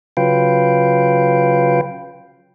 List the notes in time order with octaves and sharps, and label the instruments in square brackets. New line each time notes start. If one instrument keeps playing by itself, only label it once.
[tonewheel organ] C#3 F#3 F4 B4 F5 G5